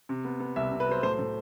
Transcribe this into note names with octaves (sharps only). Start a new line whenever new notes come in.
C3
B3
B3
C2 E5
C3
B4
F#3 C5
A2 C5
A2